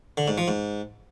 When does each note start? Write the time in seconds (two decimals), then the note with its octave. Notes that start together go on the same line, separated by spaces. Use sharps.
0.17 D3
0.28 G#2
0.38 F3
0.48 G#2